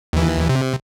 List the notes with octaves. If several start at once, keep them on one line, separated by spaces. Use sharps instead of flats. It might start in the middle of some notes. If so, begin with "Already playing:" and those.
D#2 E3
C3